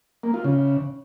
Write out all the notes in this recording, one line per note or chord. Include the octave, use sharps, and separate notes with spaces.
A#3
F4
C#3